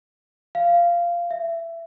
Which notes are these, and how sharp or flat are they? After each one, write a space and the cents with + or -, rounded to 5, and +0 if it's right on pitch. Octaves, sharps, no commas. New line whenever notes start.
F5 -15
E5 +20